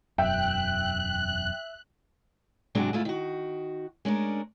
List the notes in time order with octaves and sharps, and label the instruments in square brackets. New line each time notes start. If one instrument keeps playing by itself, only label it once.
[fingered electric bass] E1 F#2 [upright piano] E5 [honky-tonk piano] G5 [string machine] F#6
[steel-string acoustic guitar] G#2 C3 F#3 G#3 D4 F#4
D2 G#2 A3 E4 F4
D#3 F#4
G#3 C#4 D4 A#4